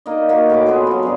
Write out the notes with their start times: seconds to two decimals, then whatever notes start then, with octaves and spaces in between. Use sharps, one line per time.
0.06 A#3 D#4 D5 D#5
0.29 A#3 F#4
0.50 A2 C#4 B5 D6
0.67 F3 B3 C4 G#4
0.87 F3 F#3
1.03 G2 C#3 G#4